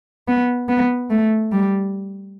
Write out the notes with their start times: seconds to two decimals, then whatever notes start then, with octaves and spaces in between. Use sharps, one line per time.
0.28 B3
0.69 B3
1.10 A3
1.52 G3